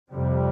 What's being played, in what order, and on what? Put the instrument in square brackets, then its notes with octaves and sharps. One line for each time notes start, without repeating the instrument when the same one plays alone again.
[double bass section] F2 C3 G3